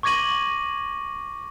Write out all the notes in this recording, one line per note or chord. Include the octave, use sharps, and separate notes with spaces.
C#6 D6 G#6 A#6 D#7 F#7